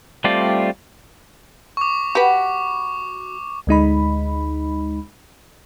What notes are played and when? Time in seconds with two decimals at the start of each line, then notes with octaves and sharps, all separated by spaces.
0.24 G3 A3 C4 F4 D5
1.77 C#6 D6
2.15 F#4 G4 B4 A5 B5
3.67 D2 G#3 D#4 B5